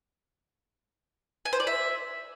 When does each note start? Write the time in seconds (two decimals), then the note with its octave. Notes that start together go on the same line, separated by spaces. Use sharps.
1.45 G#5
1.53 C5
1.60 D5
1.67 E5